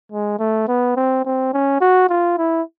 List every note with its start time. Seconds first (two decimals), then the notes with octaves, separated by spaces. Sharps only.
0.12 G#3
0.39 A3
0.68 B3
0.96 C4
1.25 C4
1.53 C#4
1.81 F#4
2.09 F4
2.38 E4